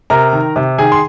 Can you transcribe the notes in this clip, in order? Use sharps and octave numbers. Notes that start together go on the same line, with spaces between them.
C3 A#4 A#5
D#3
C3
D#3 G#4 G#5
C6